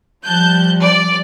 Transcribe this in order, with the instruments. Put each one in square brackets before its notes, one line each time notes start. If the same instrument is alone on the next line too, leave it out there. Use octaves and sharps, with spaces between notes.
[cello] F3 G3 [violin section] A5 F#6 G6
[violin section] D5